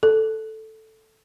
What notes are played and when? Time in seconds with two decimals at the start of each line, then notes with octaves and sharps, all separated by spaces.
0.03 A4